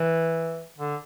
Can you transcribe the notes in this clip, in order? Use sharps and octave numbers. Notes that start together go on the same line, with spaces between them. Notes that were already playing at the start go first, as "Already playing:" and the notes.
Already playing: E3
D3